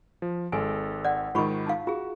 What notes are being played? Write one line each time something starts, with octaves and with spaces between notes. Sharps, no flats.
F3
G#1 G#3 A4 G#5
D5 F#5
G#2 D#3 F4 B5 C#6
D#4 F5
F4 F#4 G#4